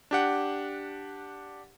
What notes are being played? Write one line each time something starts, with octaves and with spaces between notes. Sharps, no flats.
D4 G4 F#5